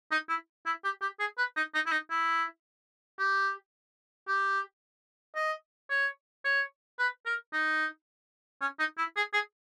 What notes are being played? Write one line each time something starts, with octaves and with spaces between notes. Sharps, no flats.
D#4
E4
E4
G4
G4
G#4
B4
D#4
D#4
E4
D#4
E4
G4
G4
D#5
C#5
C#5
B4
A#4
D#4
C#4
D#4
E4
G#4
G#4